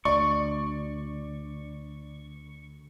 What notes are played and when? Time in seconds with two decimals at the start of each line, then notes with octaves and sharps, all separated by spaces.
0.05 D2 D5 C#6